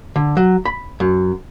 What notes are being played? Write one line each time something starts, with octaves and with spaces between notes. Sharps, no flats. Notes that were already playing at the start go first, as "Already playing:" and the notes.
D3
F#3
B5
F#2